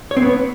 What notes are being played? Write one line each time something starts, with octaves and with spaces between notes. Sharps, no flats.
C#5
C4
B3